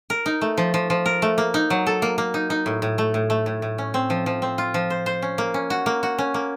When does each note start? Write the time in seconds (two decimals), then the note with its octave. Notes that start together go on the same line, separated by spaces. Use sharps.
0.10 A#4
0.26 D#4
0.41 A3
0.57 F3
0.74 F3
0.90 F3
1.06 A#4
1.22 A3
1.38 A#3
1.54 D#4
1.70 F#3
1.87 A4
2.02 A#3
2.18 A#3
2.34 D#4
2.50 D#4
2.66 A2
2.82 A2
2.98 A3
3.14 A2
3.30 A3
3.46 A2
3.62 A2
3.78 C#4
3.94 C4
4.10 F3
4.26 F3
4.42 C4
4.58 F4
4.74 F3
4.90 C5
5.06 C5
5.22 C#4
5.38 A#3
5.54 C#4
5.70 F#4
5.86 A#3
6.03 F#4
6.18 C#4
6.34 A#3